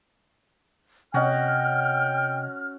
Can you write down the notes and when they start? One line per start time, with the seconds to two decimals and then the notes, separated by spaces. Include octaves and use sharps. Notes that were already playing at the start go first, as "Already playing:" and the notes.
1.14 C3 C#4 F#4 D#5 G5 F6